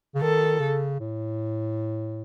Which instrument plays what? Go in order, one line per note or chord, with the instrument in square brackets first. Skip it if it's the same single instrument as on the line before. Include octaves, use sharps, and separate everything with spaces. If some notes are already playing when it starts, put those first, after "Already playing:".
[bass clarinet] C#3
[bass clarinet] D#3 [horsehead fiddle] A4
[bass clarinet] C#3
A2